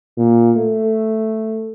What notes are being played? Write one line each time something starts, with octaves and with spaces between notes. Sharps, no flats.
A#2
A3